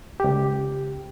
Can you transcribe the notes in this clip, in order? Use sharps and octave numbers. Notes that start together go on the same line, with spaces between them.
C#2 G4